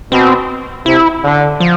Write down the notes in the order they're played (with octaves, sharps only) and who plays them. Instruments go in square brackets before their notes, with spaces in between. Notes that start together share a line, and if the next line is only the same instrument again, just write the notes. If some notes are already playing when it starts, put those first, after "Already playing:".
[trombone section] B2 [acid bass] C4
[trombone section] C3 [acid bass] E4
[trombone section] D3
[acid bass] F3